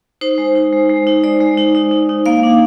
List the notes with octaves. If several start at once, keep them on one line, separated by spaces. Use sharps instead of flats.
D#4 C5
G#3
D#4
G#3
G#3
D#4
G#3 D5
G#3
D#4
D#4
D#4
D#4
A#3 F5
D4